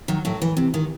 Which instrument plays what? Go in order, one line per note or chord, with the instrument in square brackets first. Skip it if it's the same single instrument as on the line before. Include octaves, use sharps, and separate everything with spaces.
[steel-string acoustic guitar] D#3 F#3
A2 F#3
E3
C3
D#3